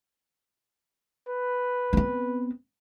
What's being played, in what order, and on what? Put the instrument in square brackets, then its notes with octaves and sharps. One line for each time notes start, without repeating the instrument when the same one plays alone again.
[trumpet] B4
[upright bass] B3 C4